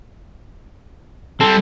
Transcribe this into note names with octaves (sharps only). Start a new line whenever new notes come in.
G3 C4 A4